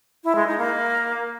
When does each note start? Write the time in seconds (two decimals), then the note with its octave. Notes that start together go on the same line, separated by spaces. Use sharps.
0.24 E4
0.35 G#3
0.47 D#4
0.58 A#3